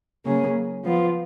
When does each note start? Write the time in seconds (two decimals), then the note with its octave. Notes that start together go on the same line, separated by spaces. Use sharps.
0.25 C#3 F#3 A#3 C#4 G#4
0.83 F3 B3 F4